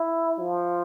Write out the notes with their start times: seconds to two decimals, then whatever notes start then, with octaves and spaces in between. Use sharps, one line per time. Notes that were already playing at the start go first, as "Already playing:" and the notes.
Already playing: E4
0.39 F3